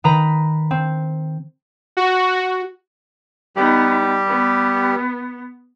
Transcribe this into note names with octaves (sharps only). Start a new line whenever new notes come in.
D#3 B4 A#5 B5
C4
F#4
G3 B3 D#4 G4
B3